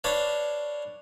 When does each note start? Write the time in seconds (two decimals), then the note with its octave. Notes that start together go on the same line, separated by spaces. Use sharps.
0.04 D4 B4 C#5 F5 A5